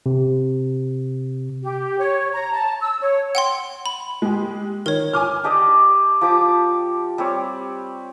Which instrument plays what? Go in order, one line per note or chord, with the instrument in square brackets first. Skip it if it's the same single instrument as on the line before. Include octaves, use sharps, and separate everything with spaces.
[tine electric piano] C3
[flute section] G4
C#5
A#5
A5
E6
C#5
[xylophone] F#5 G5 C6
B5
[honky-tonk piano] G#3 G4
[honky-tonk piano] D#3 [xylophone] A#4 C#5
[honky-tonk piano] G#5 D6 F6
[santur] D4 G4 D5 D#5
F3 G4 D6
G3 C4 C#5